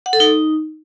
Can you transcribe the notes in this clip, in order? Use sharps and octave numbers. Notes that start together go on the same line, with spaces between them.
F#5
A4
D#4